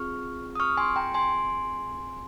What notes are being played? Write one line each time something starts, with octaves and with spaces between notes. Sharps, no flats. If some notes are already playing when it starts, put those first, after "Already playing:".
Already playing: C4 F4 G#4 C#6 F6
D#6
C#6 F6
G#5 C6
G5 A#5
G#5 C6